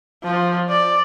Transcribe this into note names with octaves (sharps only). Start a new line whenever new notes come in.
F3
D5